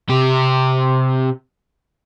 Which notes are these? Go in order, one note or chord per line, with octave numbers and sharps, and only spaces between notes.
C3 G4